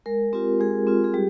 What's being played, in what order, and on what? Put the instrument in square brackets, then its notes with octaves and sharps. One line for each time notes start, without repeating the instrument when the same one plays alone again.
[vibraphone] G#3 A#4
C4 F4 G4
G#3 G#4
C4 F4
G#4
G3 G4